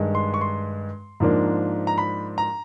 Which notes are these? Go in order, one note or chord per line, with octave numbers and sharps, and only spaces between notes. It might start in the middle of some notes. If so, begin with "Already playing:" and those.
Already playing: G2 D#3 G#3
C6
C#6
C6
G#2 F3 A#3 D4
A#5
B5
A#5